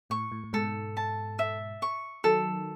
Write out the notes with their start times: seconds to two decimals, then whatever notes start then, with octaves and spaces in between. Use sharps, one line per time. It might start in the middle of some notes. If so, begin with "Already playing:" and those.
0.10 A2 C#6
0.32 A2
0.44 A2
0.53 G#2 B2 A4
0.97 A5
1.39 E5
1.82 C#6
2.24 D#3 F#3 A4